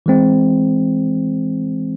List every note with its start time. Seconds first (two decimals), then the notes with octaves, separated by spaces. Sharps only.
0.06 E3 G#3 C4